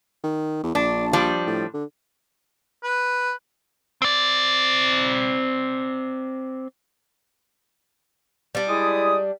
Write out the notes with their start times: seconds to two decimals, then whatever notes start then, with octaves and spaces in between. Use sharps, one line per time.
0.24 D#3
0.63 E2
0.75 A#1 D4
1.13 F3 G3 D4
1.47 A2
1.74 D3
2.84 B4
4.02 C4 D5
8.55 G3 D4
8.68 G#3 E4 D#6